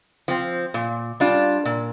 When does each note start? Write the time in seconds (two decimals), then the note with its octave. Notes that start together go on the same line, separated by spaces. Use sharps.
0.28 F3 C4
0.74 A#2
1.20 G3 D4 F4
1.65 A#2